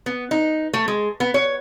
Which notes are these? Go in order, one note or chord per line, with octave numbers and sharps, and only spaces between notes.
B3
D#4
A3
G#3
B3
C#5